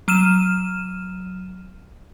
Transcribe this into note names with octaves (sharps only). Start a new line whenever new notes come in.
F#3 F6 D#7 E7